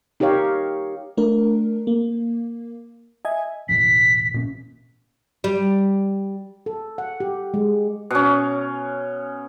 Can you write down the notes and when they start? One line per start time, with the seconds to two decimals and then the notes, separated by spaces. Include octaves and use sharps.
0.20 D#4 G4 A#4 C#5 F5
1.17 A3 D4 A#4
1.87 A#3
3.25 D#5 E5 G#5 G#6
3.69 E1 A1 B6
4.34 A#2 C#4
5.44 G3
6.66 A4
6.98 F#5
7.20 G4
7.54 G#3
8.11 B2 C#4